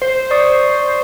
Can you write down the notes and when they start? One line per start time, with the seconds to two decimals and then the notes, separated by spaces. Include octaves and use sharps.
0.02 C5
0.31 D5 C#6 D#6